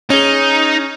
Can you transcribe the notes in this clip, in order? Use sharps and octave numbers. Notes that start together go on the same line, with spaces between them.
C#4 D#4 G#4